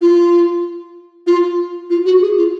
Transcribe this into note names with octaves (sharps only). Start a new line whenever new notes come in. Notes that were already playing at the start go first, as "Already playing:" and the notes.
F4
F4
F4
F#4
G#4
F4